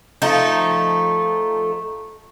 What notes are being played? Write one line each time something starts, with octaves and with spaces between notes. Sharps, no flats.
F3 A3 D#4